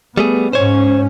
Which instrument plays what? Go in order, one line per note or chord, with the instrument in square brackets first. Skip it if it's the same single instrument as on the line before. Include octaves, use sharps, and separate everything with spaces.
[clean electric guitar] G3 A3 G#4 [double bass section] B3
[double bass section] G#2 C#4 [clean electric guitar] C5 C#5